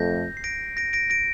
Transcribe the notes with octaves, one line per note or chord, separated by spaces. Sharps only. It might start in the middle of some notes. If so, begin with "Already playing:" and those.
Already playing: F2 A3 G6 A#6
C7
A#6 D7
A#6 D7
A#6 D7
A#6 D7